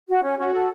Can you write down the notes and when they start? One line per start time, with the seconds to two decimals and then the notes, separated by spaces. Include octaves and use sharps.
0.09 F#4
0.23 C#4
0.38 C#4 F#4
0.53 A4